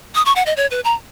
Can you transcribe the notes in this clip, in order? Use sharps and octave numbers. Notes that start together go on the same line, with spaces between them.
D#6
C#6
F#5
D#5
C#5
B4
A#5